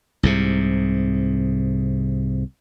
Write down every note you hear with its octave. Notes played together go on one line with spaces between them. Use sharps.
C2 G#2 C3